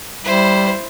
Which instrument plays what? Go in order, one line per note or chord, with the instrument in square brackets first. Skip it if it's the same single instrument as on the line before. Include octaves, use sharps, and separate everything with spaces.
[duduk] G3 [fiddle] E4 C5